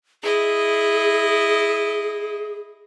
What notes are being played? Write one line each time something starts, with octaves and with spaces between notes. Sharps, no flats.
E4 G#4 D#5